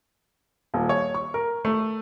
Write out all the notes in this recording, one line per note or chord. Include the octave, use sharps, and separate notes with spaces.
D#1
C#5
C#6
A#4
A3